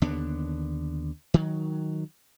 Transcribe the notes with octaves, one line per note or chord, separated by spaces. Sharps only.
D#2 D3 B3 D4
D#3 F#3